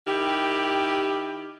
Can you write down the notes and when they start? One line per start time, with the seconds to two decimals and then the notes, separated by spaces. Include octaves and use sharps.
0.07 D#3 E4 G4